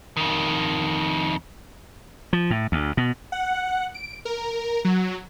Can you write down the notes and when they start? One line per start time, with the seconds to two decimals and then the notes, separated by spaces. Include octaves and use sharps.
0.17 F2 D#3
2.33 F3
2.51 A2
2.72 D2
2.97 B2
3.32 F#5
3.94 D7
4.25 A#4
4.85 F#3